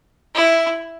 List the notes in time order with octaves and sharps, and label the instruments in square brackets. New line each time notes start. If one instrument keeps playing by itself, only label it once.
[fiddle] E4